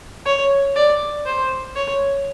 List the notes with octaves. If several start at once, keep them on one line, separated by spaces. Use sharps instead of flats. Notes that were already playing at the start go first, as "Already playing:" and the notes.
C#5
D5
C5
C#5